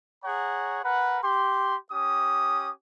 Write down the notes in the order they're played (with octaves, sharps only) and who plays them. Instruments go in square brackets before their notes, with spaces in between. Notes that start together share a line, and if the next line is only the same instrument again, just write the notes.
[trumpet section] G#4 C#5 F#5 A#5
A#4 B4 F#5
G4 C6
C#4 G4 D#6